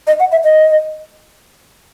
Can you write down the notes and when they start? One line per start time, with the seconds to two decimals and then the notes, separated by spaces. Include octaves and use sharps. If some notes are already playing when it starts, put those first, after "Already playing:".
0.07 D#5
0.20 F#5
0.32 E5
0.44 D#5